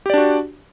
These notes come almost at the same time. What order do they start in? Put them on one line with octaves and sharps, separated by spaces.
G4 D5 D4 F#4